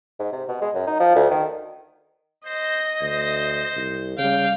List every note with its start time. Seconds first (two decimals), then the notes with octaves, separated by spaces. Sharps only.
0.19 G#2
0.32 C3
0.48 B2
0.62 G#3
0.74 F#2
0.87 D#4
1.00 F3
1.15 D2
1.30 D#3
2.45 C5 D#5 A#6
3.01 D2 C5
3.76 C2
4.18 C#3 G3 F5 G5